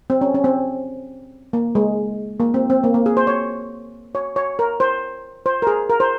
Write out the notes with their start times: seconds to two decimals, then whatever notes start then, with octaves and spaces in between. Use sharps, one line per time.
0.10 C4
0.21 C#4
0.35 C#4
0.44 C4
1.53 A#3
1.75 G#3
2.40 A#3
2.54 C4
2.70 C4
2.84 A#3
2.94 A#3
3.06 G#4
3.17 C5
3.27 C#5
4.15 C#5
4.36 C#5
4.59 A#4
4.80 C5
5.46 C5
5.62 A#4
5.67 G#4
5.90 A#4
6.00 C5